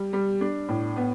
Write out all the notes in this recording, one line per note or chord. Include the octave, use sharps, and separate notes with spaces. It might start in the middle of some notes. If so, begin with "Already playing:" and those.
Already playing: G3
G3
D4
A2
B3